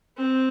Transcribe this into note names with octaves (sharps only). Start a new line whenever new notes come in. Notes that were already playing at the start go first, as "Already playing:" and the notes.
C4